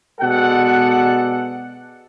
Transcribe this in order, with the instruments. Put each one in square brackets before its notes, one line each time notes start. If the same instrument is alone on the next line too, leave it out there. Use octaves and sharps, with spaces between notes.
[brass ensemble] B2 G#3 A4 D5 F#5